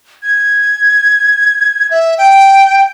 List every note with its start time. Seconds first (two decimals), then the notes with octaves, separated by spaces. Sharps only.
0.23 G#6
1.91 E5
2.18 G5